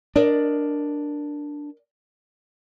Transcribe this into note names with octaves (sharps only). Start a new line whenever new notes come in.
D4 A#4 D5 D#5